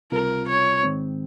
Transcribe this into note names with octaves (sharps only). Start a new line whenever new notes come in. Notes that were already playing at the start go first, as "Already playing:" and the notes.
C#2 C3 G3 C4 F4 A#4
C#5
G#2 D#3 G#3 C4